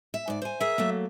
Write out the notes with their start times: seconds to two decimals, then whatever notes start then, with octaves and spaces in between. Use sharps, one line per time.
0.14 E5
0.28 G#2 D5
0.42 C5 G#5
0.61 G#4 A#4 E5
0.78 F#3 A3 A#3